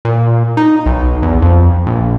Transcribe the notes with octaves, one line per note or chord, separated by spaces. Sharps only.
A#2
D#4
B1
E2
F2
A#1